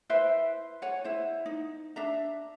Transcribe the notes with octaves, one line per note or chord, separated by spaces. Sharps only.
E4 B4 C5 E5
C#5 F#5 G#5
E4 C5
D#4
D4 E5 A#5